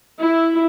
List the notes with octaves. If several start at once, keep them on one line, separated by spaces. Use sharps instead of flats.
E4